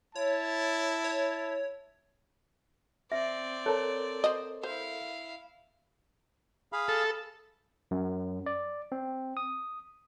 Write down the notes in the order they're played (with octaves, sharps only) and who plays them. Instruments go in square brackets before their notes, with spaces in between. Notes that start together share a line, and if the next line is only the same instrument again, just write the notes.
[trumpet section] E4 A5 [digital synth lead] C#5
[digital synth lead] C#5
[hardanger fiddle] C4 D5 [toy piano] E5
[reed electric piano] A4 A#4 [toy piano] C#5 A5
[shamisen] C5 D#5
[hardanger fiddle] E4 F5 [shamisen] C5
[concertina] G#4 F5 B5
[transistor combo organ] A4
[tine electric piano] F#2
D5
C4
D#6